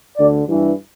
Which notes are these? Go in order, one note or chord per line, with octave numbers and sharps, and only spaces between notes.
D2 D3 D5
G2 E3